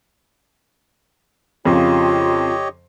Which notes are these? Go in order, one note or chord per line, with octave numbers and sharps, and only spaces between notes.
F2 C#3 F4 G4 C#5 D#5